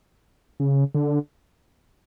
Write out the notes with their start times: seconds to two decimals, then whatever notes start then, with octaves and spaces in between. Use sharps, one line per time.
0.60 C#3
0.95 D3